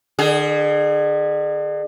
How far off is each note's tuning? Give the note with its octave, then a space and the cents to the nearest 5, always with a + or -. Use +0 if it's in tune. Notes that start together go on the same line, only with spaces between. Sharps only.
D3 +40 G#4 +0